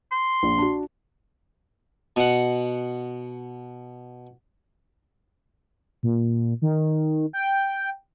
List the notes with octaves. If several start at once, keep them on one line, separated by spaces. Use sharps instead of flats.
C6
A#1
D4 F#4
B2 F#5
A#2
D#3
G5